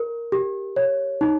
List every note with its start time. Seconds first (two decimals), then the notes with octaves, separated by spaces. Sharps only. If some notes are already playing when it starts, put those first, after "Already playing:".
Already playing: A#4
0.32 G4
0.76 C#5
1.21 D#4